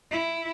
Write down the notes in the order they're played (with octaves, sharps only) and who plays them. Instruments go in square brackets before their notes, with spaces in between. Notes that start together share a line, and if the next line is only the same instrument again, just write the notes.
[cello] E4